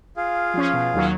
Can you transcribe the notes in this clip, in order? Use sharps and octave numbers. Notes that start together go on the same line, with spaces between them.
F4 G#4 F5
F3 C#4
B2
D#2 F#3